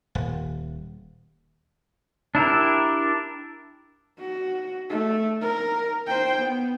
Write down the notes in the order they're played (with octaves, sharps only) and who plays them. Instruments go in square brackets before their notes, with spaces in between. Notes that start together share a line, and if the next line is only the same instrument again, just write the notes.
[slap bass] D#1
[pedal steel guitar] D4 E4 G4 A#4
[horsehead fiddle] F#4
A3
A#4
C5 G5
B3